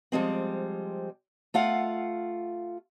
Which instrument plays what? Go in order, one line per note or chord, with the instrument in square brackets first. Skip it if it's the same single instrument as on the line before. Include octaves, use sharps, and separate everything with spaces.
[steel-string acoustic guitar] F3 G3 G#3 C4
A3 F4 F5 F#5